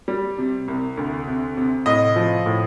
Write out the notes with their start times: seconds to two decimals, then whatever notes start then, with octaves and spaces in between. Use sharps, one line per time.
0.08 G3
0.38 C3
0.68 C2
0.97 D2
1.27 C3
1.57 C3
1.86 A2 D#5
2.16 F3
2.46 A2